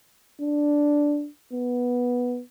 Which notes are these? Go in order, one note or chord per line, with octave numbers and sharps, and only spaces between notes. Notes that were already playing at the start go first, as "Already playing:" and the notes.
D4
B3